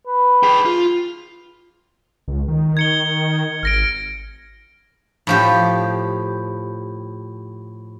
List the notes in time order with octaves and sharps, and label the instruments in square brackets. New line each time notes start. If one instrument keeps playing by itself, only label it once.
[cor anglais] B4
[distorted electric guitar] G#4 G5
F4
[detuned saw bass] C#2
D#3
[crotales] G#6 C#7 G7
[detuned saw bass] G#1 [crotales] F6 A#6 D7
[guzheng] A2 F3 G4